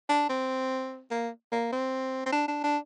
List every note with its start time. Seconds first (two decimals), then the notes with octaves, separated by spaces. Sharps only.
0.09 D4
0.29 C4
1.11 A#3
1.52 A#3
1.72 C4
2.26 C4
2.32 D4
2.48 D4
2.64 D4